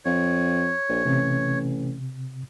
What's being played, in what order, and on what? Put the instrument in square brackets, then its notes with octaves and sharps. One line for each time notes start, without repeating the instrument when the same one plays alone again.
[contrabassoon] F2 [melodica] C#5
[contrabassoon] A#1
[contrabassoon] A1 [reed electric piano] C3